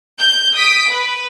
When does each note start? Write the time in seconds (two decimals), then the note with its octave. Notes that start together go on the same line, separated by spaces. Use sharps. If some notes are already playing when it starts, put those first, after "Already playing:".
0.20 G6
0.55 D#6 B6 D7
0.90 B4